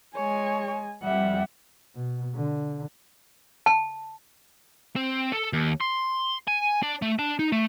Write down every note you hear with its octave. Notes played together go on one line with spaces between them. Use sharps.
G#3 C#5 G#5
F2 G3 E5 F#5
B2
D3
A5
C4
A4
D#2
C6
G#5
D4
A3
D4
D#4
A3